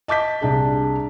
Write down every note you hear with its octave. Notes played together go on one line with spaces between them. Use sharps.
D#5 A5 D6 G6 B6
C2 D4 G#4